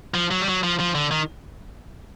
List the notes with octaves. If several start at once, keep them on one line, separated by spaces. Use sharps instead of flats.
F3
F#3
G3
F#3
F3
F3
D3
D#3